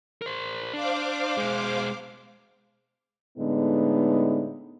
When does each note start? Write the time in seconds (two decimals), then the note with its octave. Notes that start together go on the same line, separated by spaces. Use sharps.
0.22 A#4 C5
0.73 D4 C5 F5 D6
1.38 B2 G#3
3.38 A2 D3 G#3 B3 D#4